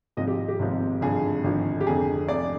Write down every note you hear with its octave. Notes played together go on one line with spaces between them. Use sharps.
G#1 G#2 F3 C4 D#5
G4
G4
G#1 G#2 F3 C4
G#1 G2 D3 F3 G#4
G#1 G2 D3 F3
G4
F1 F2 D3 G#4
F1 F2 D3 D5